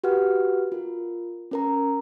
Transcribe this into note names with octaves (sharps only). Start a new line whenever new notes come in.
F#4 G4 B4 F#5 F6
F4 A#4
C#4 A#4 A#5